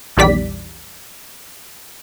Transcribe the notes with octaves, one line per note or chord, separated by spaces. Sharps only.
A#1 E2 D#3 G3 D5 B6